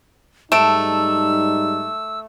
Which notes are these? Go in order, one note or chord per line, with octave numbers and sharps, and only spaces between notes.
G#2 G3 A3 D#4 A5 E6 D7 E7